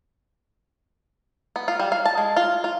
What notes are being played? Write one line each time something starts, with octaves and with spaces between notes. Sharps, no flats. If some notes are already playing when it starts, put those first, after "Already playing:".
B3
F4
G3
F5
A5
G#3
F4
F4